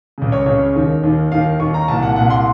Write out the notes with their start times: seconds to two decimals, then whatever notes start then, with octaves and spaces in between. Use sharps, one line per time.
0.18 C#2 C#3
0.32 C#5
0.46 C#2 C#3 C#5
0.75 D#2 D#3
1.03 D#2 D#3
1.32 D#2 D#3 F5
1.60 D#2 D#3 C#6
1.74 A#5
1.88 C2 A#2 A5
2.02 F#5
2.16 C2 A#2 F#5
2.30 C6